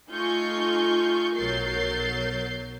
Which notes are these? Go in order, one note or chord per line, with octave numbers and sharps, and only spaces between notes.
A3 D#4 F4 G#5 C#6 G6
B1 F#3 A#4 G6 A6 C7